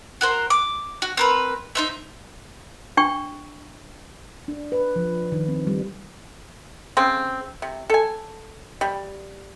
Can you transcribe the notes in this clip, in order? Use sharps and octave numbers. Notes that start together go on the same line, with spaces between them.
F#4 A#4 C5
D6
F#4
C4 A#4 B4
D#4 C5 E5
D4 G5 C#6
D4
B4
F3
D#3
C4
G3
C#3 C4
C3
A4 G#5
G3